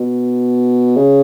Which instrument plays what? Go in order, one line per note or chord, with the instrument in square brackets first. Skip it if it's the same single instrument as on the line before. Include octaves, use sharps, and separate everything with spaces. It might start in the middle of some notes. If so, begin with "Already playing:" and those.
Already playing: [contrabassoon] B2
C#3